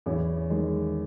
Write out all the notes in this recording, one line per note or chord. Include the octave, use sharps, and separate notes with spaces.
E2 C#4 E4
D#3 G#3